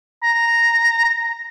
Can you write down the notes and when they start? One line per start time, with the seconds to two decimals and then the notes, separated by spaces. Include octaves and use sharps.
0.23 A#5